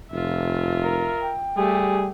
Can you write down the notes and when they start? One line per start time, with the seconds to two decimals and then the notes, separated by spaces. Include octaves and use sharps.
0.12 F1 F4 E5
0.83 A#4
1.21 G5
1.57 G3 A3 G4 G#4